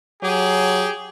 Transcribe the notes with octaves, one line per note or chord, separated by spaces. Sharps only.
F#3 G4 G#4